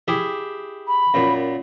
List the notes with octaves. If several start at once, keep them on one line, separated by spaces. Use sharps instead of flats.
E4 G4 G#4
B5
F#2 A#2